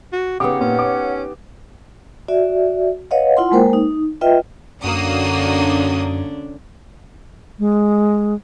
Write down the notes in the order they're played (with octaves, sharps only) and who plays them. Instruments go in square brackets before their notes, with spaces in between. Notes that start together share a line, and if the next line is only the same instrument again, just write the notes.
[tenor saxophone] F#4
[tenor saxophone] C#3 [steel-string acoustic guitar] B3 D#4 G4 [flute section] C#5 F#5 [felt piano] D6 D#6
[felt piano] A#2 [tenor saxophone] C#4
[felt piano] D6
[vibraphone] F#4 D5 E5
B4 C#5 D#5 F5 F#5
E4 F4 F#5 C6
G#3 A#3 A#4 C5 G5
D#4
F4 B4 D#5 E5 G5
[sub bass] F#2 [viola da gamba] D3 C#4 D4 [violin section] A#3 F#4 D#6
[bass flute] G#3